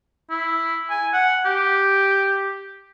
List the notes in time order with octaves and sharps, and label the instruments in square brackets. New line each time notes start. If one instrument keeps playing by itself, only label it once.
[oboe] E4
G#5
F#5
G4